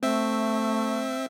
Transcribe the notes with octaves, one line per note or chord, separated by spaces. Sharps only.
A3 C4 E5